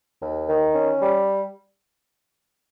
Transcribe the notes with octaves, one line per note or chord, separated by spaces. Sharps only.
D#2
D#3
C#4
G3